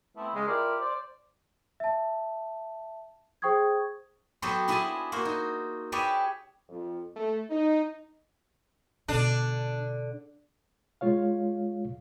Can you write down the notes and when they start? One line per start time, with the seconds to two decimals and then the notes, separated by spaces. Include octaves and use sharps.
0.17 A3 B3 C4 E4
0.34 C#3 G#3
0.47 E4 F4 G4 A#4 D5
0.81 C5 D5
1.80 E5 A5
3.42 G#4 C5 G5 C#6 D#6 G#6
4.42 F#3 B3 F#4 G4 A4 C5
4.68 D4 E4 G#4 E5 G#5 A5
5.12 A#3 F#4 C5
5.25 D#4
5.92 G4 G#4 B4 C#5 D5 E5
6.69 F2
7.17 A3
7.50 D#4
9.08 B2 D3 D4
11.01 G#3 F4 C#5 F5